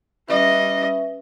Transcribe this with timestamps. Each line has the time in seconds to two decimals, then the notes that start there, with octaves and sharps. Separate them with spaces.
0.28 G3 C#4 B4 D#5 E5